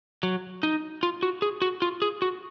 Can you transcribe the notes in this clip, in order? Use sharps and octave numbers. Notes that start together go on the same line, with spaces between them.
F#3
D#4
F4
F#4
G#4
F#4
F4
G#4
F#4